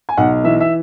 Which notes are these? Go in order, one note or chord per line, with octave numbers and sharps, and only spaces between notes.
G#5
B1 F#5
E3 E5
E5